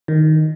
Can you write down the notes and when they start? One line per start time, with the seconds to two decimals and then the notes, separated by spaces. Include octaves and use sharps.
0.08 D#3